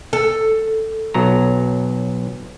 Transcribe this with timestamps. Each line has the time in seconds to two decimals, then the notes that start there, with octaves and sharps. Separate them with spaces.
0.13 A4
1.14 B1 F#3 A#5